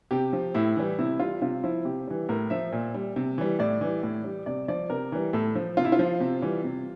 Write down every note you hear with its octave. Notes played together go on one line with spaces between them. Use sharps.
C3 G4
F3
A2 E4
E3 G3
C3 E4
G3 F4
C3 F4
F3 E4
C3 G4
E3 G3
A2 A#4
F3 E5
A#2
G3
C3
E3 G3
A2 D5
E3 G3
A2
G3
C3 D5
F3 D5
C3 A#4
E3 G3
A2 A4
F3
C3 F4
E4
F4
F3
C3
E3 G3
C3